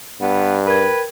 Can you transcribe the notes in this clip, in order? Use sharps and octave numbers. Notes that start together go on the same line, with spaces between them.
G2 B3
A#4 B4 G5 G#6